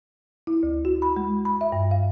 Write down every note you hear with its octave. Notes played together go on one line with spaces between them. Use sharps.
E4
D2
F#4
B5
G#3
B5
E5
G2
F5